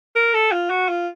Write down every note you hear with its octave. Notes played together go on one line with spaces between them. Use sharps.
A#4
A4
F4
F#4
F4